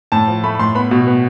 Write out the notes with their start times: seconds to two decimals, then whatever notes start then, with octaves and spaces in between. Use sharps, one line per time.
0.12 A2 A5
0.28 F3
0.43 A3 B5
0.55 B5
0.59 A2 C6
0.75 B3 B5
0.91 B2
1.07 B3